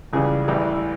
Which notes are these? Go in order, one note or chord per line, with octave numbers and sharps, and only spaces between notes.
C#2 C#3 E3 G3 G#4
A1 A2 E3 G3